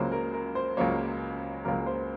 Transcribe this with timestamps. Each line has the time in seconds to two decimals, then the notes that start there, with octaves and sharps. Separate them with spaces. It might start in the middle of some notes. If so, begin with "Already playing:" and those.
Already playing: C#2 C#3 F#3 A#3 C5
0.12 A#4
0.33 A#4
0.55 C5
0.77 C#2 C#3 F#3 A#3 C#5
1.64 C#2 C#3 F#3 A#3 A#4
1.86 C5